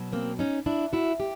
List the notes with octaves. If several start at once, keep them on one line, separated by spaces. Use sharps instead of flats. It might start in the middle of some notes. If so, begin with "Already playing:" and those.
Already playing: B2 F#3
A#3 C4
C#4 D#4
D4 E4
E4 F#4
G4